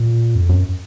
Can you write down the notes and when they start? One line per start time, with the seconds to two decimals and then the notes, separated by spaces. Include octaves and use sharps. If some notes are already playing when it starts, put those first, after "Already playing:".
Already playing: A#2
0.35 F2
0.49 F#2